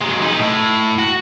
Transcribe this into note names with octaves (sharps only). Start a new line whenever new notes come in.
F#3 G#3
D#4 B4
A2
F#4